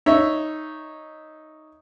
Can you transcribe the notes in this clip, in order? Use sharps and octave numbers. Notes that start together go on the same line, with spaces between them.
D#4 C#5 E5